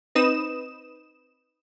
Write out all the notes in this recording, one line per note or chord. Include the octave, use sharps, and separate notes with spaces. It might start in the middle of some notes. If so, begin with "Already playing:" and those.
C4 D#4 B4 D#6 E7